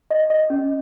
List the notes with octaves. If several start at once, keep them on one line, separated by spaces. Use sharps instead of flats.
D#5
D#5
C#4